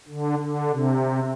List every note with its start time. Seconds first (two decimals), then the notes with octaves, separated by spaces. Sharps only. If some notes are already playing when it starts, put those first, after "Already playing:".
0.08 D3
0.39 D3
0.70 C3